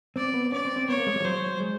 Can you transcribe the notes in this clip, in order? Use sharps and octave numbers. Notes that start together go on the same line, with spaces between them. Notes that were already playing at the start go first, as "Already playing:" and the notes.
C4 D5
B3
C#4 D5
C4
C4
B3 C#5
A#3
G#3
G3
F3
F#3 C5
G#3